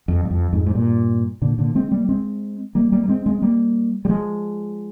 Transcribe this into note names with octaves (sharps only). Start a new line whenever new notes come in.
F2
G2
F2
F2 G#2
G#2
G2 A#2
A#2 D3
A#2 D3
G#3 C4
G3 A#3
G#3 C4
G3 A#3
G3 A#3
A#3
G#3 C4
G#3 C4
G3 A#3
G3
F3 G#3